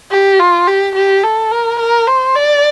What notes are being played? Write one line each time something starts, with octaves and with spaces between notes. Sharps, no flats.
G4
F4
G4
G4
A4
A#4
A#4
C5
D5